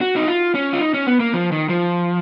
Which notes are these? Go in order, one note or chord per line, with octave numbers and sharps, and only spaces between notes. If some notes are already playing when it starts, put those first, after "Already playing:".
F#4
D#4
F4
C#4
F4
D#4
C#4
B3
A#3
F3
D#3
F3